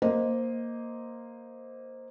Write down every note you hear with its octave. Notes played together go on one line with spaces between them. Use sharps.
A#3 C5 D#5